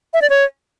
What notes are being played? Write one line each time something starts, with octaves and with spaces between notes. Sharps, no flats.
E5
D5
C#5